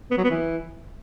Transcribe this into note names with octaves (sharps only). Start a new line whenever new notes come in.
B3
F#3
B3
E3